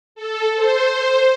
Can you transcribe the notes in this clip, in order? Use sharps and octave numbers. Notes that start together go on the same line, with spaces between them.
A4
C5